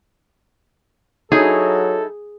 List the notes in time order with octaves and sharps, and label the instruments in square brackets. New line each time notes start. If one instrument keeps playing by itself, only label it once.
[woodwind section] F#3 [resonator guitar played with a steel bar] D#4 E4 [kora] G#4 [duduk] A4